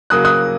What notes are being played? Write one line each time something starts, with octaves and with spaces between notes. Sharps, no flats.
C#3 F#3 A#3 D#6 F#6
D#6 F#6